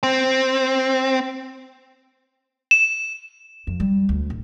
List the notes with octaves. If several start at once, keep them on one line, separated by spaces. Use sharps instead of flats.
C4
E7
F2
G3
D2
D1